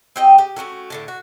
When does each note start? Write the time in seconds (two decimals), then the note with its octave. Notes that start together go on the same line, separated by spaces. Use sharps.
0.16 C4 G4 D#5
0.38 G4
0.56 A3 C#4 F#4 A4
0.90 A2 D3 A5
1.08 F#4